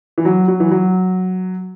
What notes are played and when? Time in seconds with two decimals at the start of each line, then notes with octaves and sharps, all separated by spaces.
0.18 E3
0.25 F#3
0.48 F#3
0.60 E3
0.71 F#3